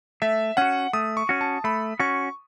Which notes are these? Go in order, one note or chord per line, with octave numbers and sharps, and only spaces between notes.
A3 E5
C#4 F#4 F#5
A3 D#6
C#6
C#4 F#4
A5
A3 B5
C#4 F#4 C#6